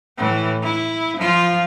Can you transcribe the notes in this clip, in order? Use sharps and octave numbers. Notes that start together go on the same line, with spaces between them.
A2 E3
E4
F3 F4